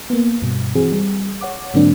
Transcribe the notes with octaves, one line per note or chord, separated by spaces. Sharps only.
A#3 B3
G2 B2
E3 C4 F#4 G#4
G3 G#4
C#5 F#5 D6
G#2 D3 F#3 A#3 C4 D4